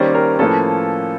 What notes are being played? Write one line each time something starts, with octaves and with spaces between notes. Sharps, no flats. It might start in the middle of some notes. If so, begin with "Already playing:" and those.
Already playing: D#3 G3 A#3 C#4 C5 D5
A#4 C5
A2 F3 A#3 C#4 A4 B4